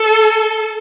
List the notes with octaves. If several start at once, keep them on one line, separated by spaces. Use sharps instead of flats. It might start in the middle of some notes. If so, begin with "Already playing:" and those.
Already playing: A4